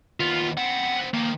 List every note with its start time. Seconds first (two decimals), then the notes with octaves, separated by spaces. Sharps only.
0.20 D#2 B3 F4
0.57 B3 C4 F#5
1.14 D#3 F3 A#3